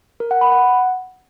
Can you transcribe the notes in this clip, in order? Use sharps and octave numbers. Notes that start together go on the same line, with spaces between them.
A#4
F#5
B5
F#5